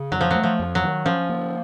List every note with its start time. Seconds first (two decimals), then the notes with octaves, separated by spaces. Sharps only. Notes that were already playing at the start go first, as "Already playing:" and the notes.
Already playing: C#3
0.11 F2 F#3
0.21 F3
0.31 F#3 A3
0.44 F3
0.59 F2
0.75 F#3
0.82 D#3
1.05 F3 C#4
1.29 A#3